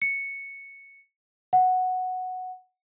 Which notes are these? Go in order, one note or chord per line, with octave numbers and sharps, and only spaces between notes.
C#7
F#5